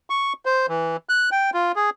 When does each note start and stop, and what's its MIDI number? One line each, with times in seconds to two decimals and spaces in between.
0.10 0.33 85
0.45 0.66 72
0.68 0.97 52
1.09 1.30 90
1.32 1.50 79
1.54 1.72 65
1.76 1.90 68